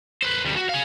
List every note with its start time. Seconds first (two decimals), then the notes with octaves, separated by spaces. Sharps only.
0.23 B4 C5
0.44 D2 G3
0.56 F#4
0.69 G#4 F5